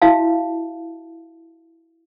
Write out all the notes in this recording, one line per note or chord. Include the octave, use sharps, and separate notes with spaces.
E4 F#4 E5 F5 A5